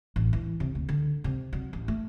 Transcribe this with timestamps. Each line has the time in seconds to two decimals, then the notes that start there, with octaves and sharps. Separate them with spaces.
0.16 A1
0.33 E3
0.60 C3
0.75 D2
0.89 D3
1.24 C3
1.53 F#3
1.73 A1
1.88 A3